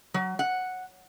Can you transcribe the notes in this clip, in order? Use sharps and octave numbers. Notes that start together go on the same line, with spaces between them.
F#3
F#5